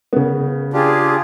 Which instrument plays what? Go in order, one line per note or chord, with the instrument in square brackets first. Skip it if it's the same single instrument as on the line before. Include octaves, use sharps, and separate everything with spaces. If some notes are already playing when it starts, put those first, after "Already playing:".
[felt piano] C#3 B3
[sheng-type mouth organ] D4 F4 G4 [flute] G#4